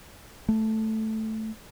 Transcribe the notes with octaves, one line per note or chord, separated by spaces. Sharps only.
A3